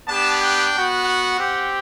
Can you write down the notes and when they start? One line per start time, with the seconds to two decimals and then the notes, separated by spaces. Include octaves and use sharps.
0.08 B3 D4 G4 A5
0.42 G5
0.74 B3 F#4
1.07 F#5
1.39 C4 G4